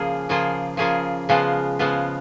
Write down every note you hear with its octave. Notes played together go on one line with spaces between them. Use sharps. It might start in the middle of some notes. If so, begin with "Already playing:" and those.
Already playing: C#3 F3 A#3 F4 G#4
C#3 F3 A#3 F4 G#4
C#3 F3 A#3 F4 G#4
C#3 F3 G#3 B3 F4
C#3 F3 G#3 B3 F4